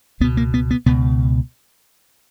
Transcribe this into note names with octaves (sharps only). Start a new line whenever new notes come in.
C#2 B2 B3
A#3
B3
B3
C#2 B2 B3